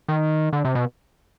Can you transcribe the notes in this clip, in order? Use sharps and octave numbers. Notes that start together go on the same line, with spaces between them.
D#3
D3
C3
B2